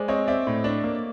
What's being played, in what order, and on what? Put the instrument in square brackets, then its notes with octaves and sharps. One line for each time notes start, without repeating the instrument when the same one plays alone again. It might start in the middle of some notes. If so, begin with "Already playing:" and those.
Already playing: [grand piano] G#3 [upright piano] C5 D5
[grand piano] C4 [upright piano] C#5 D#5
[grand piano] C4 [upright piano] D5 E5
[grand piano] A2
D4
A#3